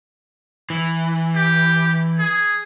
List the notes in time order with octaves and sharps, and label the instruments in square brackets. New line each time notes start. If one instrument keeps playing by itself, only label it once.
[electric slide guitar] E3
[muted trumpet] G4
G#4